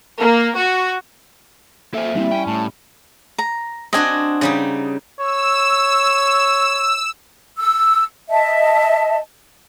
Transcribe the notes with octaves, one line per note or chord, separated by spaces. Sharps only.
A#3
F#4
A#3 A4 C5 E5 G#5
D3 G3 C4 E4
C#4 G5
A2 A5
A#5
C4 D4 F#4 D#5 G#5
C#3 G3 D#4
C#5 E6
E6
D#5 E5 A5